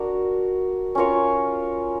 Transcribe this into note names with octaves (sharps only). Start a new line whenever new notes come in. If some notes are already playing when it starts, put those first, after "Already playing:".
Already playing: D4 F#4 A#4
C#4 F4 A#4 C#5